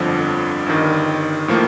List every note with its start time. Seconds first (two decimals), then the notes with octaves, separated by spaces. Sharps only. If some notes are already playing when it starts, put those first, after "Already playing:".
Already playing: G1 F2 D3 F3
0.66 G1 G2 D#3
1.48 A2 F3 A#3